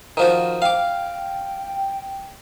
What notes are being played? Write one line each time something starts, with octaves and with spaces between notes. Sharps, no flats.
D#3 F3 F#4
F5 G5 D6